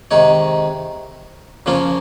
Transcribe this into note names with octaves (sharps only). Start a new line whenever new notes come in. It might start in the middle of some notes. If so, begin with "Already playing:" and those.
C3 D#3 G#3 D#4 C#5
C#3 F3 A#3 C#4 F4